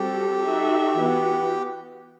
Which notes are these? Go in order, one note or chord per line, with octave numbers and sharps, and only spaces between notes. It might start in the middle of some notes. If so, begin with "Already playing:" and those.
Already playing: G3 C4 F#4 G4 A4
D#4 F#4 A4 E5
E3 B3 F#4